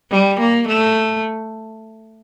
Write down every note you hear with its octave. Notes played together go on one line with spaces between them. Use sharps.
G3
A#3
A3